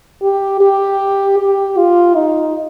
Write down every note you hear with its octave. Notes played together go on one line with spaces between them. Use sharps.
G4
G4
G4
F4
D#4